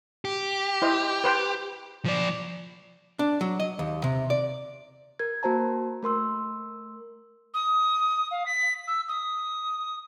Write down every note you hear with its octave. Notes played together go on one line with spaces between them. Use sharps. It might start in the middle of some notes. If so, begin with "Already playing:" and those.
G4
E4 C5 D#5
B4 C5 G5
F3 D5
D4
F#3
D#5
D#2
C3
D5
A#4 G#6
A#3 F#4 C5 A5 A#5
A3 A#4 C6 E6
D#6
F5
B6
E6
D#6